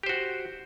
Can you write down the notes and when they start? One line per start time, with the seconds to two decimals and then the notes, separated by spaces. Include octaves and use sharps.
0.03 G4
0.06 C5
0.09 F#4